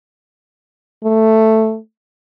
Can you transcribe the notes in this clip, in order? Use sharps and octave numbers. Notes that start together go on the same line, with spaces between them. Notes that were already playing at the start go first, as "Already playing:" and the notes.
A3